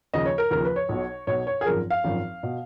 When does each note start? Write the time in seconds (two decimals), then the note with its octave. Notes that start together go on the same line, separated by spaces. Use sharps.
0.14 D#2 C#3 F3 D#5
0.26 C#5
0.38 A#4
0.51 D#2 C#3 F3 A#4
0.65 B4
0.76 C#5
0.89 B1 B2
1.27 B1 B2 C#5
1.47 C#5
1.61 G#4
1.66 G#1 F#2 F3 A#4
1.90 F5
2.04 G#1 F#2 F3
2.43 B2